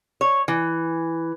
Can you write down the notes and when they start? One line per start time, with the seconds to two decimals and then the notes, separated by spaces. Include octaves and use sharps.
0.21 C#5
0.48 E3